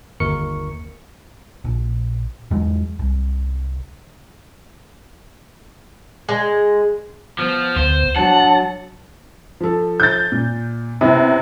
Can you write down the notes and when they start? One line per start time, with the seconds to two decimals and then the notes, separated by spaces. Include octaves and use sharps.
0.20 G1 D#2 A#4 C#6 C#7
1.64 A#1
2.51 E2 F#3 G#3
2.99 C2
6.29 G#3
7.39 F3 B3
7.76 D2 C5
8.16 F#3 D4 F#5 A5
9.60 F3 A4
10.00 G6 A6
10.32 A#2
11.01 C3 B3 C#4 E4